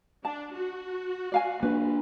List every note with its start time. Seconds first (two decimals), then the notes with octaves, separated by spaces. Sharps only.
0.25 D4 A5
0.55 F#4
1.32 D5 F5 G#5
1.63 A#3 D4 B4